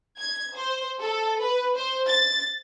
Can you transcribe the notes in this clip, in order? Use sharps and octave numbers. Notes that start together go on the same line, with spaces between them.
G#6
C5
A4
B4
C5
A6